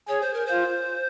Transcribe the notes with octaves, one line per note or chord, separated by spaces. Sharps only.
G#4 C#5
C5
A#4
F4 C5